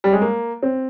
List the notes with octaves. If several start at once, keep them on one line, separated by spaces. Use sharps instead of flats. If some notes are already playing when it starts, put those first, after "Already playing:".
G3
G#3
A#3
C4